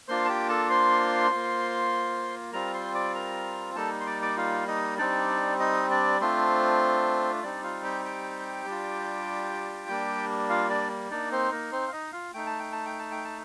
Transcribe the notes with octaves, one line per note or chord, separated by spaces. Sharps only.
A#3 D4 F4 C5 C6
A5
G4 G5
A4 A5
C5 C6
A#3 F4
G3 C4 F4 A#4 A#5
C5 C6
D5 D6
A#4 A#5
G3 A#3 D#4 A4 A5
C6
D5 D6
D5 D6
F4 F5
D#4 D#5
G3 C4 D4 D#4 D5
D#4 D#5
D4 D5
A3 C4 D4 F4 C5
G3 C4 D4 D#4 D5
F4 F5
G4 G5
G4 G5
G3 D4 F4
G3 A#3 D4
F4 F5
D4 D5
A#3 D4 D#4 D5
C4 C5
A#3 A#4
C4 C5
F5
D#4 D#5
F4 F5
A3 D#4 G5
A5
G5
A5
G5
A5
G5
A5